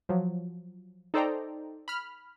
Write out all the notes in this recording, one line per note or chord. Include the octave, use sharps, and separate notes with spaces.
F3 F#3
D#4 A4 C5 D5 G5 A#5
B5 F6